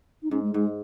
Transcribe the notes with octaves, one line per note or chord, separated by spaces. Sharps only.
D#4
G#2 C#4
G#3
G#2 G#3